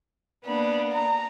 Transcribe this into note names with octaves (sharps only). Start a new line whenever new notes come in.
A#3 B3 D4 B5
A#5